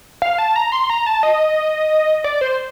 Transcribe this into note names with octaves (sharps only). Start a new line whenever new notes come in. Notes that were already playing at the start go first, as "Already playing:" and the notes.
F5
A5
A#5
C6
A#5
A5
D#5
D5
C5